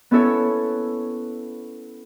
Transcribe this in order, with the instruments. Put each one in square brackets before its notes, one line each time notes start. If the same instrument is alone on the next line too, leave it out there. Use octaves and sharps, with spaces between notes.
[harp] B3 C#4 E4 A4 C#5